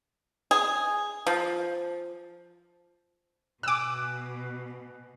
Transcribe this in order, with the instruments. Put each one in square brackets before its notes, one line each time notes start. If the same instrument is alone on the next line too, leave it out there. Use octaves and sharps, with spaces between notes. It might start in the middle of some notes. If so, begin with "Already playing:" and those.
[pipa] G#4
F3
[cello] B2 [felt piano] G#5 F#6 [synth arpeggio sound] D6 E6